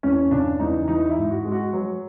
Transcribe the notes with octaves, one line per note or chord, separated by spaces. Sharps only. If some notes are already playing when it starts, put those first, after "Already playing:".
E2 C#4
C#3 D4
E2 D#4
E3 D#4
E4
G#2
F#4
G#3
F#4
F#3